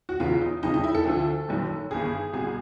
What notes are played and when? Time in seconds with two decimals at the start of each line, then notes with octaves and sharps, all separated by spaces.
0.09 F#4
0.20 E2 C#3 E3 F4
0.41 D#4
0.63 G1 F2 C#3 D#4
0.74 D#4
0.84 E4
0.95 A4
1.05 D2 D3 F3
1.49 F#1 F#2 D#3
1.90 G1 G2 D#3 G#4
2.33 C2 B2 G#4